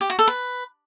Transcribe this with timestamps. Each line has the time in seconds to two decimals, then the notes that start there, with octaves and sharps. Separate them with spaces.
0.01 G4
0.10 F#4
0.19 A4
0.28 B4